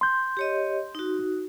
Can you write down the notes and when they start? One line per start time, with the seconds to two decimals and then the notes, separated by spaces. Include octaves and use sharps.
0.01 C6 G6
0.37 G4 C#5 D#5
0.95 D#4 F#4